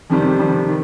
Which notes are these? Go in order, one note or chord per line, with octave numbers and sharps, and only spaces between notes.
F2 C3 D#3 G3
F2 C3 D#3 G3
D#3